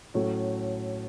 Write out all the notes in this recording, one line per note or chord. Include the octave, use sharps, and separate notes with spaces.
A2 F#3 A3 C#4